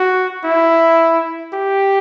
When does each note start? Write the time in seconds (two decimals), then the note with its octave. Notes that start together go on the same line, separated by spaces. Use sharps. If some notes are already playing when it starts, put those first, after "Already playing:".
Already playing: F#4
0.44 E4
1.53 G4